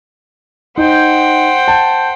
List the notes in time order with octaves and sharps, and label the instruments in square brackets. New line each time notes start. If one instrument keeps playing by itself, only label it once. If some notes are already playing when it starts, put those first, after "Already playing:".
[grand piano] D#4 [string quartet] C5 F#5 G5
[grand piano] A5